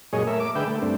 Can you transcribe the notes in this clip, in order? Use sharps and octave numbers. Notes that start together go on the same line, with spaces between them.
F#2 A#2 G#3 G#4 C#5 D#5
A3 A#4 E5
D6
D3 G#3 B4 E5 G5
A3
G2 A3 C4 D4